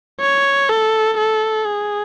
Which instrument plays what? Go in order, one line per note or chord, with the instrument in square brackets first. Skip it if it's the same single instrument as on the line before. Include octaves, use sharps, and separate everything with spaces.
[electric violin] C#5
A4
A4
G#4